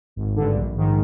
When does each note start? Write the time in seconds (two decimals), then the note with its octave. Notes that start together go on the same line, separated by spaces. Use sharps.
0.16 G#1
0.36 G2 D3
0.56 A#1
0.76 G#2 D#3